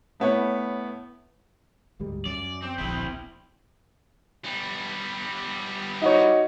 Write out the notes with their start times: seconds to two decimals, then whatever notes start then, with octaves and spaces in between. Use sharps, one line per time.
0.20 A2 B3 C#5
2.00 D2 G#2 G3
2.25 F#2 D5
2.62 C4
2.78 D1 A#1 C4 E4
4.44 G3 B3
6.02 D#4 F#4 C#5